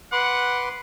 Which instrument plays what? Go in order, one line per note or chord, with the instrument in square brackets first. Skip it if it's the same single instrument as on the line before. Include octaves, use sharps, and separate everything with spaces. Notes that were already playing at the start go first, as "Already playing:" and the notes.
[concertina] B4 C6 D6 [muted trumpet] F#5